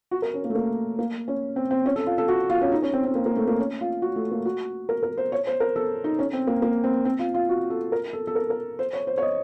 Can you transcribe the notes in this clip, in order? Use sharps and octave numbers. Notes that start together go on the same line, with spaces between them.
F#4
A#4
C#4
A#3
A3
A#3
A#3
C#4
C4
C4
C#4
A4
F4
A4
F#4
F4
C#4
D#4
C#4
C4
C4
A#3
A#3
A3
A#3
C#4
F4
F#4
A3
A#3
F#4
A#4
A#4
C5
C#5
C5
A#4
A4
D#4
C#4
C4
A#3
A#3
C4
C4
F4
F4
F#4
A4
A#4
A4
A4
A#4
A#4
C5
C#5
C5
C#5
D#5